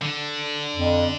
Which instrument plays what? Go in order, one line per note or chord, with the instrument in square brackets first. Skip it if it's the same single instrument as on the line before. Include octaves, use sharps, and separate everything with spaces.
[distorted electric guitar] D3
[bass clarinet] F2